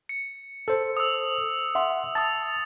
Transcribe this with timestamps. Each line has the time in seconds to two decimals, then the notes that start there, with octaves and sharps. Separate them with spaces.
0.09 C#7
0.68 A4 C5
0.97 D#6 E6
1.75 E5 F#5 C6
2.15 A5 D#6 A6